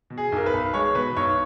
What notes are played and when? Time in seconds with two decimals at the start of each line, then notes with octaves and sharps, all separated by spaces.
0.10 B2
0.18 G#4
0.32 B1 A#4
0.46 B4
0.53 B1
0.74 G#3 C#5
0.95 B2 B4
1.16 B1 C#5